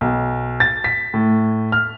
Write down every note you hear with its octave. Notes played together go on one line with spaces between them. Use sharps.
B1
A6
B6
A2
F6